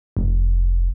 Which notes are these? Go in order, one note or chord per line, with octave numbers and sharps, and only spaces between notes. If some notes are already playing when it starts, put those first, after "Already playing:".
F1